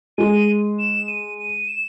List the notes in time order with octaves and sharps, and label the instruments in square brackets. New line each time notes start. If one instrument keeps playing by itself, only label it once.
[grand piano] G#3 [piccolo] D#7
[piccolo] E7
D#7
D#7
E7